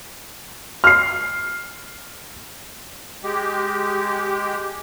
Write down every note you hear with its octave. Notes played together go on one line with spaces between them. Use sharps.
F6 C7
G#3 G4